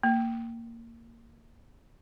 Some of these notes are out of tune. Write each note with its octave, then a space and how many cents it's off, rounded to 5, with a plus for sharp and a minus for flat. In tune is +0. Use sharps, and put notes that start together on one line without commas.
A#3 -15